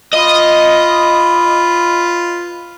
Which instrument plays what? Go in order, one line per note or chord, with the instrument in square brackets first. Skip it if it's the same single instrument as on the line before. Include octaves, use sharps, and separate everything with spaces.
[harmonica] F4 B4 [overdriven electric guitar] D#5